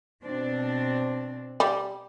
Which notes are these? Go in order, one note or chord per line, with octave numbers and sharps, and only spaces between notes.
B2 C4 D4
G3